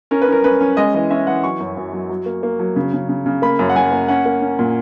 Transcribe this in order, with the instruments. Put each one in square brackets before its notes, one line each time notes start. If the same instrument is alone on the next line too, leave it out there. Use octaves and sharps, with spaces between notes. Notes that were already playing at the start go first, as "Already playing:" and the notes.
[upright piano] C#4 A#4
B4
C#4 A#4
C#4 B4
C#4
G#3 D#5
E3 D#5
C#4 E5
E3 F#5
F#3 C#6
F#2
F#2
F#3
F#3
A#3
A#3
F#3
C#3
C#3
C#3
C#3
A#3 B5
F#2
F#5
F#2 G#5
A#3
C#4 F#5
A#3
C#4
A#2